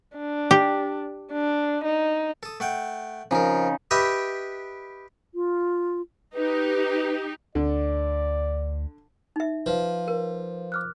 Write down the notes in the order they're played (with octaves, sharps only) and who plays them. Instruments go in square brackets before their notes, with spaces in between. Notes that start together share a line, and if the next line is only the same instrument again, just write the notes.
[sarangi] D4
[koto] G4
[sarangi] D4
D#4
[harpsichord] A4 D#6
A3 F#5 G5
[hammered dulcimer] C#3 D#4 [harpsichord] F3 A#4
[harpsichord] G4 B4 D#5 E5 G5
[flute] F4
[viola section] D#4 G4 [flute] B4
[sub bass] D2 [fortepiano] D3 [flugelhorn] D5
[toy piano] D#4 E5
[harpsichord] F3 [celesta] B4 C5 F5
[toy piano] A#4
[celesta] D6 F6 F#6